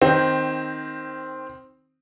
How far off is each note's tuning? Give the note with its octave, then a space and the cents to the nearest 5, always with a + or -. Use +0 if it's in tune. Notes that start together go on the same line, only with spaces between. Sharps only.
D#3 +0 C4 +5